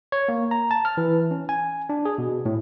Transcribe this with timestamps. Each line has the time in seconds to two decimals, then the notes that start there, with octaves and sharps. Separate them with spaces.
0.12 C#5
0.28 A#3
0.51 A#5
0.71 A5
0.85 F6
0.97 E3
1.31 C#4
1.49 G#5
1.89 D4
2.05 G#4
2.18 B2
2.45 A2